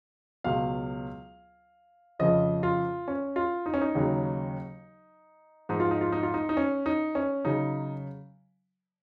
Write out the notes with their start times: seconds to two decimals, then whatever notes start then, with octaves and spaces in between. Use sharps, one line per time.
0.44 C#2 B2 F#3 F5
2.19 F2 C#3 F3 D#5
2.63 F4
3.08 C#4
3.36 F4
3.66 D#4
3.74 C#4
3.81 D#4
3.95 D#2 C#3 F#3
5.69 G#2 F3 D#4
5.80 F4
5.91 D#4
6.01 F4
6.12 D#4
6.23 F4
6.34 D#4
6.49 D#4
6.57 C#4
6.86 D#4
7.15 C#4
7.45 C#3 F#3 D#4